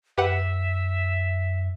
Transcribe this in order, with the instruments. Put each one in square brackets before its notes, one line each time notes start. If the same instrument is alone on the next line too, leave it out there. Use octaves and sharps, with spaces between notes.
[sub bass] F#2 [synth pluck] G4 B4 F#5 [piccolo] E5